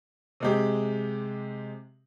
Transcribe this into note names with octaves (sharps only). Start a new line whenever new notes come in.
C3 G#3 G4